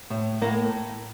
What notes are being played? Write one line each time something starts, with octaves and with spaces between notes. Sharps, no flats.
A2
A2 A#3